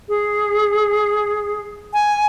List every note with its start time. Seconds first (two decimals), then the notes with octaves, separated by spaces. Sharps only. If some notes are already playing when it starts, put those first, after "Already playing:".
0.09 G#4
1.93 G#5